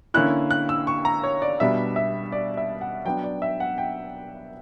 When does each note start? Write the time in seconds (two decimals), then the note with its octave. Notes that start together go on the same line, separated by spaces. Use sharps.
0.14 D3 A#3 C#4 E4 F#6
0.51 F#6
0.69 E6
0.87 C#6
1.05 A#5
1.24 C#5
1.42 D5
1.60 B2 G3 B3 D4 E5
1.96 E5
2.32 D5
2.57 E5
2.81 F#5
3.05 F#3 B3 D4 G5
3.24 D5
3.42 E5
3.60 F#5
3.78 G5